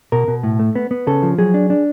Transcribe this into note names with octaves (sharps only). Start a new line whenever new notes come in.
B2 A#4
B2
A2
A3
B3
B3
C#3 A4
F3
F#3 G#4
D4
D4